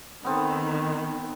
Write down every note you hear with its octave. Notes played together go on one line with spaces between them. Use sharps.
D#3 B3 C4 A4